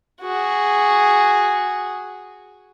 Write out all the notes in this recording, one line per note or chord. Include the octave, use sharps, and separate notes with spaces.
F#4 G#4